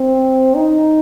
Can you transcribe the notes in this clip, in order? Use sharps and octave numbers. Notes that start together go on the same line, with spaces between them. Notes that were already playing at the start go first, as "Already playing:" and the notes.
Already playing: C4
D#4